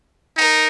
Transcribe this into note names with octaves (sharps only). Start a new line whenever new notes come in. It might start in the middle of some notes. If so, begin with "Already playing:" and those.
D#4 A#4